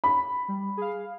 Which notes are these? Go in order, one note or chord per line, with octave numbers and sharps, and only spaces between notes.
B5
G3
G#4 F5